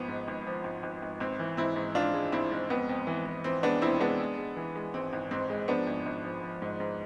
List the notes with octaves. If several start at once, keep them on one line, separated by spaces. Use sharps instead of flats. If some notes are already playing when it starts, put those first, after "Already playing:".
Already playing: G#1 F3 B3
G#2
G#1
F3
G#1
G#1
G#1
G#1 C4
E3
G#2 C4 E4
G#2
G#2 D4 F4
G#3
G#1 C4 E4
G#2
F2 B3
F2
E3
E3
E3 C4
G#3 B3 D4
F1 C4 E4
G#3 B3 D4
G#3
G#3
E3
G#3
G#1 C4
G#1
G#2 C4
G#3
F3 B3 D4
G#1
G#1
F3
F3
G#2
G#2